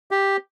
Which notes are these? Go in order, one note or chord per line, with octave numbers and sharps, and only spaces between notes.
G4